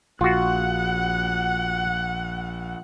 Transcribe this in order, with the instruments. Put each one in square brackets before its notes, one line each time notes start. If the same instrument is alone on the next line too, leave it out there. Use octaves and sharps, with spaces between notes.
[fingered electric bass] A#1 [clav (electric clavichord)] F4 F#4 [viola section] F#5